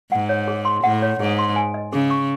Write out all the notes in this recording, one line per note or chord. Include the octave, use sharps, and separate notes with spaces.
G#2 F#5
C#5
G#4
C6
A2 F#5
C#5
G#2 G#4
C6
G#5
D#5
C#3 G#4
C#6